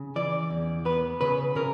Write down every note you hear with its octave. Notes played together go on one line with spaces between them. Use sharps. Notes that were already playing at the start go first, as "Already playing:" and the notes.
Already playing: C#3
E3 D5
E2
B3 B4
C#3 B4
C#3 A#4